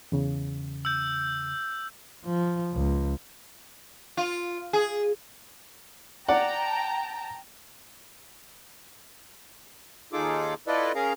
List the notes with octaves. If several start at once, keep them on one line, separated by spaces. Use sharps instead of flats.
E2 C#3
E6 G6
F3
C#2
F4
G#4
D5 F#5 G5 A5 A#5
D#2 D#4 F4 G#4 A4 D6
E4 F4 A4 B4 D5 D#5
C#4 G#4 A#4 F5 A#5